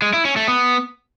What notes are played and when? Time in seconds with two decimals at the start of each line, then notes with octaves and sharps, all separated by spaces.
0.02 G#3
0.13 E4
0.25 C#4
0.36 A3
0.48 B3